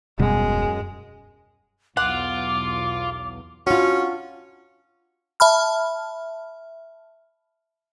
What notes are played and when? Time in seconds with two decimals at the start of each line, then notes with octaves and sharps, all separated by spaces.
0.19 D#1 F#2 B2 G3 G#3
1.97 B1 E2 F4 F#5 D6
3.67 C#4 D4 F4 F#4
5.40 E5 A5 B5 F6